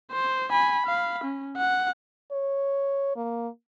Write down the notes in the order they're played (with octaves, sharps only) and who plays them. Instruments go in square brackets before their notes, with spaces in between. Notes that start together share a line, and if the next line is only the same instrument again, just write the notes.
[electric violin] C5
G#5 B5
F5 B5
C#4
F#5
[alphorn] C#5
A#3